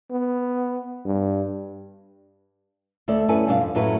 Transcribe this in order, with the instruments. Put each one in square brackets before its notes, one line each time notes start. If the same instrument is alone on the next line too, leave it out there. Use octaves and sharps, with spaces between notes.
[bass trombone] B3
G2
[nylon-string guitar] D2 A3 A4 D5
F#2 C#4 E4 A4 B4 G#5
G2 B2 G3 D4 C5 F5
F2
F#2 A2 F#3 A3 E4 B4